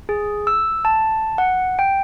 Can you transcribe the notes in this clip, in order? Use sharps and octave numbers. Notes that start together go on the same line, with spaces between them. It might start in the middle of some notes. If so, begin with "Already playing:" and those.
G#4
E6
A5
F#5
G5